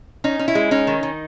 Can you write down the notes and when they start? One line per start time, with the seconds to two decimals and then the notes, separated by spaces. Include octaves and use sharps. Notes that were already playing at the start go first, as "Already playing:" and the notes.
0.24 C#4 D#4
0.39 C#4
0.48 E4
0.55 G#3
0.71 C#4 D#4
0.87 D#3
1.03 D#3